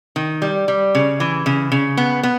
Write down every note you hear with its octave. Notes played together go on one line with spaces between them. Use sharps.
D#3
G3
G3
C#3
E3
C#3
C#3
B3
B3